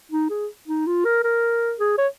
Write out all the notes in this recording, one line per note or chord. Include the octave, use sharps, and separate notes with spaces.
D#4
G#4
D#4
F4
A#4
A#4
G#4
C#5